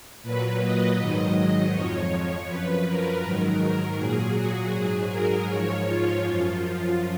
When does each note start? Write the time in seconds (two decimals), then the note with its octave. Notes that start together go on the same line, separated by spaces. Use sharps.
0.23 A#2 F#3 B4
0.60 D#5
0.98 G#2 D#3 F#3 D#5
1.72 F2 F3 C#5
2.10 C#5
2.48 F#2 F3 B4
2.85 A#4
3.22 G#2 D#3 F#3
3.60 A#4
3.97 A#2 F#3 G#4
4.35 F#4
4.72 G#2 F#3 G#4
5.10 A#4
5.47 G#2 F3 C#5
5.85 F4
6.22 F#2 F3